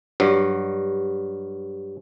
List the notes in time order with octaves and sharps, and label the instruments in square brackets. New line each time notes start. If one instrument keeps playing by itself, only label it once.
[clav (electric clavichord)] G2 F#3